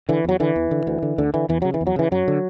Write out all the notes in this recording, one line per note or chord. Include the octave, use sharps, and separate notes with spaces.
D3 E3
E2 F#3
D3 E3
E2
D3
D2
D3
D2 D3
D3 E3
E2 E3
C#3 F#3
E3
E2
F#3
C#3 E3
F#2 F#3
D3